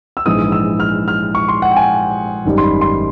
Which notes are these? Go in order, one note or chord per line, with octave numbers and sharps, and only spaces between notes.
E6
A#1 G#2 E3 D#6
E6
F6
F6
C#6
C6
F#5
G5
G#5
G#1 F#2 D#3 G3
C6
B5
C6